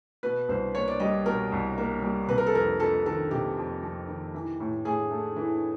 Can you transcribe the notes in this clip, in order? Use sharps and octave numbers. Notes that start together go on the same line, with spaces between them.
B2 B4
C2 C5
A#3 C#5
D5
G3 D#5
B2 A#4
C2
A#3
G3
C3 B4
A#4
A4
F2 A#4
F2 A4
D#3 A4
C3 G4
F2
F2
D#3
E3
A2
A2 G#4
A3
E3